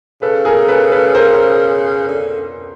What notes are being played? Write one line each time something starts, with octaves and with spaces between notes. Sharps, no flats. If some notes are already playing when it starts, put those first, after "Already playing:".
C#3 A4 B4
G#4 A#4
A4 B4
A4 B4
A#4 C5
D3